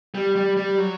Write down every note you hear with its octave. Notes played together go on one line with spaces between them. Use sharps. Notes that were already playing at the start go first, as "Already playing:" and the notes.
G3
G3
G3
F#3